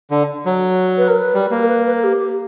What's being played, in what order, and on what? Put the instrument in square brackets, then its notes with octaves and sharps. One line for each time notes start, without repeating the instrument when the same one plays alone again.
[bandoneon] D3
F#3
[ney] B4
A#4
B4
[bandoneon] G3
A#3
[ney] A#4
B4
B4
A#4
G4